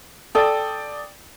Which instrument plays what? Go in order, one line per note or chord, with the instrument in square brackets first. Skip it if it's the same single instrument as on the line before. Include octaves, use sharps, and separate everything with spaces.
[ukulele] A4 [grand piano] D5 G5 D#6